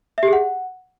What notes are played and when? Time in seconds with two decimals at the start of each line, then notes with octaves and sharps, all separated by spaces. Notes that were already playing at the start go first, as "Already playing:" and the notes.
0.18 E5
0.23 G4
0.28 G#4
0.33 F#5